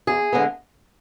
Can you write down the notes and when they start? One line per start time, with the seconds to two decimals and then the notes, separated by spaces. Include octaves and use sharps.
0.07 E2 G#4
0.32 D3 G#3 B3